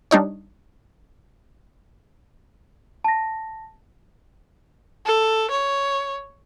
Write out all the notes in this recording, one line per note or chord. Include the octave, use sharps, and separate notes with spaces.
G3 D4 D#4 C#5
A5 A#6
A4
C#5